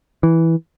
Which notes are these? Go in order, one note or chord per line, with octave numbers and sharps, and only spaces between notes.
E3